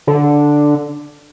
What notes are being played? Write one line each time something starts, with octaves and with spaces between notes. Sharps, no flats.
D3